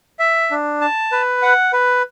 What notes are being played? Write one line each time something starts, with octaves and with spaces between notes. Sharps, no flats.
E5
D4
A5
B4
F#5
B4